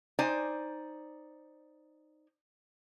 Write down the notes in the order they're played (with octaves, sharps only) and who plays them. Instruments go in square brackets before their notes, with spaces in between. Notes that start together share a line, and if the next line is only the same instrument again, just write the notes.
[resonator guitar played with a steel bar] D#4 C5 D5 G#5